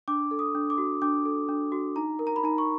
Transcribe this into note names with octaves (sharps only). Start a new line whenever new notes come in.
D4 D6
A4
D#6
D4
D6
F#4
D4 D6
A4
D4
F#4
D#4 A#5
A#4
A#5
B5
D#4 A#5
C#6